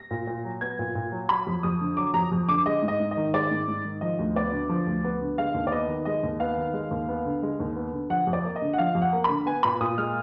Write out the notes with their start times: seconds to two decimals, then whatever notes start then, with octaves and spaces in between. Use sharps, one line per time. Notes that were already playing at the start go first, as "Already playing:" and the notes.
Already playing: A#6
0.11 A#2
0.27 A#2
0.45 F#3
0.61 B3 G#6
0.79 A#2
0.95 A#2
1.12 F#3
1.29 F#3 B5
1.47 F2
1.63 F2 D#6
1.81 D3
1.97 F#3 D6
2.14 F2 A#5
2.32 F2
2.48 D3 D6
2.66 G#3 D#5
2.82 G#2
2.88 D#5
3.00 G#2
3.11 D#5
3.17 D#3
3.34 G#3 D5
3.51 G#2
3.68 G#2
3.85 D#3
4.01 F3 D#5
4.19 D2
4.35 B3 D5
4.52 D3
4.69 F3
4.87 D2
5.04 B3
5.21 D3
5.38 G#3 F5
5.54 D#2
5.67 D5
5.72 B3 D#5
5.88 D#3
6.05 G#3 D#5
6.23 D#2
6.40 B3 F5
6.57 D#3
6.73 G#3
6.91 D#2
7.09 B3
7.25 D3
7.43 G#3
7.60 D#2
7.76 B3
7.93 D3
8.10 F3 F#5
8.27 F2
8.33 D5
8.45 A#3
8.56 D#5
8.62 D3
8.73 F#5
8.78 F3 F5
8.95 F2
9.02 F#5
9.13 A#3
9.24 D3 B5
9.46 B3 G#5
9.63 A#2 B5
9.80 A#2 D#6
9.98 G#3 F6